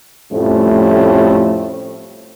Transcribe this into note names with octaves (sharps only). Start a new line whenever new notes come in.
F2 A2 F3 G3 A3 C#4